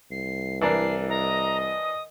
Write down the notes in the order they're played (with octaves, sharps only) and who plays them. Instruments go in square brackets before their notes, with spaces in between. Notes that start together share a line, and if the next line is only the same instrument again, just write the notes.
[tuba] C2 [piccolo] C7
[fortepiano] E3 D4 A#4 [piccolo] C7
[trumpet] D#5 [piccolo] A#5
[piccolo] D#6